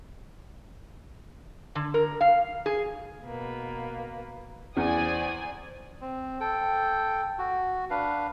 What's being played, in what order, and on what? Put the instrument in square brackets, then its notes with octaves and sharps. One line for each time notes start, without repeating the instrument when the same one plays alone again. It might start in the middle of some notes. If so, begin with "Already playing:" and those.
[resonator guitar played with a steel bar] D3
A#4
F5
G#4
[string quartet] B2 A#3 B4
[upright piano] E2 [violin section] C5 D5 G#5 [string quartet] D#6
[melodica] C4
A4 G5
F#4
D4 B4 F5